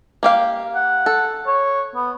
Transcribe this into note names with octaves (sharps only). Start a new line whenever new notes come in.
A#3 G4 F5
F#5
A4
C#5
B3